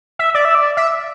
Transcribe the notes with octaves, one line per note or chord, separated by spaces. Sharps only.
E5
D5
E5
D5
E5